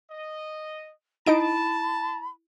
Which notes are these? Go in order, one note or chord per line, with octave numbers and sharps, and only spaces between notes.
D#5
D#4 E4 D#5 A5 B5 D7